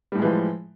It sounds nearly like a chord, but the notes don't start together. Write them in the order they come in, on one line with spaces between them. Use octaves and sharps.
G3 A2 G#3 E3 F3